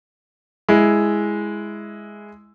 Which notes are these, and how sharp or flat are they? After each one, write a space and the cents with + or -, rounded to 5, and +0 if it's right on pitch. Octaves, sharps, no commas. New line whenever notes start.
G#3 +0 E4 +0